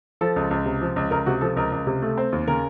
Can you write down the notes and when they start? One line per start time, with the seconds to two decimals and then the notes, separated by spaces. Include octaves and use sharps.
0.21 F3 A4
0.36 C#2
0.51 C#2
0.66 C3
0.81 F3
0.96 C#2
1.11 C#2 A#4
1.26 C3 F#4
1.41 F3 A4
1.57 C#2 A#4
1.72 C#2
1.87 C3
2.02 A3
2.18 C4
2.32 D#2
2.47 C#3 A#4